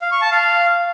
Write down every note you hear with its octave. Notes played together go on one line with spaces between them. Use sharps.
F5
C#6
A5
F5